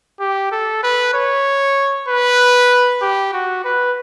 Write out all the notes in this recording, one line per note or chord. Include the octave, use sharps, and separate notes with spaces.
G4
A4
B4
C#5
B4
G4
F#4
B4